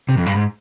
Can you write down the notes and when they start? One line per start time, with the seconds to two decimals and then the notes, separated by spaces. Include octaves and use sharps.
0.09 C3
0.17 F2
0.26 G2
0.35 G#2